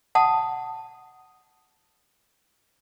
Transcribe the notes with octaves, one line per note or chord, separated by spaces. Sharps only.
F#5 A5 D#6